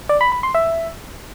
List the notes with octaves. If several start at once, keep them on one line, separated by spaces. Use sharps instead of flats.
D5
B5
B5
C6
E5